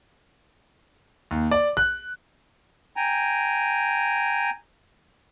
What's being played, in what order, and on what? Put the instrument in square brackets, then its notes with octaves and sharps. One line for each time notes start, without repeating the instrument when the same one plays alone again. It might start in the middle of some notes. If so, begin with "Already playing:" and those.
[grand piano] D#2
D5
F#6
[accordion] G5 G#5 A#5